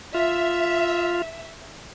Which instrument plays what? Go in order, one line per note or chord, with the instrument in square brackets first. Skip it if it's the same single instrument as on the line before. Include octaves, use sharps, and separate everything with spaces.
[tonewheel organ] F4 [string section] E5